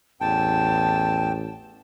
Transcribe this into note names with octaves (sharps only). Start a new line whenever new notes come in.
A1 E2 G5 A5